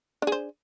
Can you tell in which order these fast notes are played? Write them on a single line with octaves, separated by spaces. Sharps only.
D4 G#4 C5